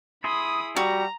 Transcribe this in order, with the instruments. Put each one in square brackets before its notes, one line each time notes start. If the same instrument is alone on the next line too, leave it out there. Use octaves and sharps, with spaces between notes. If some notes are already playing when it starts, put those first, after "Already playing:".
[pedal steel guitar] E4 G#4 C6 [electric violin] B5 D#6
[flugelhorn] G3 [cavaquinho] F#4 [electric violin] A#5